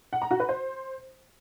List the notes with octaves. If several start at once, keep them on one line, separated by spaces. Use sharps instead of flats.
F#5
A#5
F#4
B4
C5